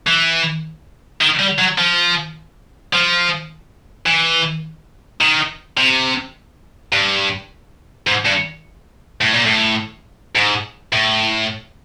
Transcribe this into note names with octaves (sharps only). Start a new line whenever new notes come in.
E3
D#3
G3
F#3
F3
F3
E3
D#3
C3
G2
G#2
G2
A2
A#2
A2
G#2
A2